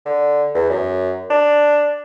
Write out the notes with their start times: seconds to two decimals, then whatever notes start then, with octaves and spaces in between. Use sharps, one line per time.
0.06 D3
0.54 E2
0.70 F#2
1.30 D4